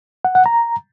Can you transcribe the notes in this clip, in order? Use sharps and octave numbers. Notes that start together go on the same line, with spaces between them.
F#5
F#5
A#5